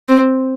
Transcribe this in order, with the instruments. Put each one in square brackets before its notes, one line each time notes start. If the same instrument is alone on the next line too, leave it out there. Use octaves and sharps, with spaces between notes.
[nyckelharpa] C4